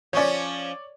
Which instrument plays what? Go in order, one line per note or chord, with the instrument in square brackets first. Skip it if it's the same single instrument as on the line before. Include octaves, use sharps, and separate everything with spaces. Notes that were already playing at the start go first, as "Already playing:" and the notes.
[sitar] F3 C#4 [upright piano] C#5 D5